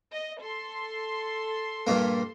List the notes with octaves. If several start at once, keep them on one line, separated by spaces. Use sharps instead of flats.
D#5
A4 C6
G2 A#2 A#3